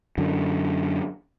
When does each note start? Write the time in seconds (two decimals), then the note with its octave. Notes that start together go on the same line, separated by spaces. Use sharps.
0.18 F#2 D3